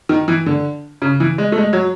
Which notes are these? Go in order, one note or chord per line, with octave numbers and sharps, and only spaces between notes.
D#3
E3
D3
C#3
E3
G#3
A3
G#3
F#3